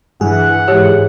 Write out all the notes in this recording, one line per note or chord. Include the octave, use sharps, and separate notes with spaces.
G2 E3 G#4 F#5
G#2 E3 G4 C#5